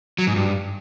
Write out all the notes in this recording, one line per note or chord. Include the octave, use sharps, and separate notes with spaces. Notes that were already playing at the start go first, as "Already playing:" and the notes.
F#3
G#2
G2